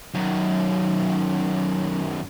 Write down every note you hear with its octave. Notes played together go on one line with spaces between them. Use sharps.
F#2 D#3